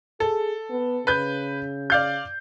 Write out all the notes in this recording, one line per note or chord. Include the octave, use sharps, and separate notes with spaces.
G#4 A4
B3
C#3 B4 G6
D5 F5 G6